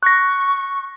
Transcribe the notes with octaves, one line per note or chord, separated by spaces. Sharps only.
C#6 F#6 A#6